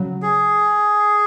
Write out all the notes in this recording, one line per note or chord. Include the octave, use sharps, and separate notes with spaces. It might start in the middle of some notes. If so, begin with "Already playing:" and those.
Already playing: C#3 F#3
G#4